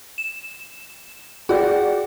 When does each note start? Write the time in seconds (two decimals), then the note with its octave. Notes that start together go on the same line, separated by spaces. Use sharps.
0.18 E7
1.49 F#4 G#4 D5 G5